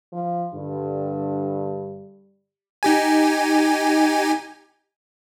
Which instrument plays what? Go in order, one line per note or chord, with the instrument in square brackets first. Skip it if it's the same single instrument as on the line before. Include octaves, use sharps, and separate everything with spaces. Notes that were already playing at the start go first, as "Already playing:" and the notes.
[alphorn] F3
[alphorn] G2 [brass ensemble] D3 [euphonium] G3
[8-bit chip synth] D#4 G4 G#5